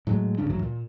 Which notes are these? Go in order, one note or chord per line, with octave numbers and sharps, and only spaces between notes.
A2 F#3 G#3 A3
D1 G2 C#3 D4
D2 G2 E3 F#3
A#2